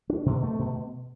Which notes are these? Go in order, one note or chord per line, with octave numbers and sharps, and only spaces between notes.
D4
B2
A3
B2